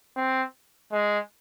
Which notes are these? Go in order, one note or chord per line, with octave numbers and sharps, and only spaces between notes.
C4
G#3